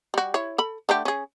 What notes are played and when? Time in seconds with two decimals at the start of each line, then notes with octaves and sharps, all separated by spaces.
0.14 G3 F#4
0.34 E4 C#5
0.58 A4 B5
0.89 D3 A3 G4
1.05 C#4 G#4